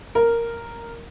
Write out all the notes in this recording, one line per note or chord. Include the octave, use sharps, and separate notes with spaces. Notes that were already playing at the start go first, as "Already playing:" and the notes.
A#4